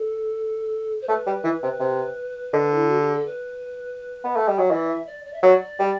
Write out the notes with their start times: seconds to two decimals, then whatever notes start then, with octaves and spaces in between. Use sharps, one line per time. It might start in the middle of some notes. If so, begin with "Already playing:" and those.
Already playing: A4
1.02 C5
1.08 A3 B4
1.27 G3
1.44 E3
1.63 C3
1.80 C3
2.53 D3
2.74 E4
2.88 F#4
3.00 G4
3.13 A4
3.26 B4
4.24 B3
4.36 A3
4.48 G3
4.59 F#3
4.71 E3 D5
4.88 E5
5.06 D5
5.25 D5
5.33 E5
5.42 F#3 D5
5.79 G3